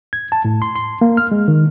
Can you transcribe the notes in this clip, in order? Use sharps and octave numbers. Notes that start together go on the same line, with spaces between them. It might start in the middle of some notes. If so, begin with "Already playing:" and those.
G#6
A5
A2
C6
C6
A#3
F6
G#3
D#3